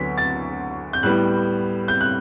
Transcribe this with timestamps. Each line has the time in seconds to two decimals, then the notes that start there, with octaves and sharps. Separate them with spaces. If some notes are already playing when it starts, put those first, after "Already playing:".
Already playing: D2 D3 F#3 B3 B6
0.18 A6
0.93 G6
1.03 A2 G3 B3 F#6
1.88 G6
2.01 F#6